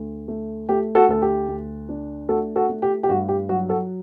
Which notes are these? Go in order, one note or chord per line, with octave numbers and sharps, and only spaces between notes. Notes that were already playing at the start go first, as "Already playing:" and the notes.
Already playing: D2
A3
A3 G4
F#4 A4
D2 A4
G4
D2
D4
A3 F#4 A4
F#4 A4
A3
G4
G4
G2 F#4
G4
F#3 F#4
F#4 A4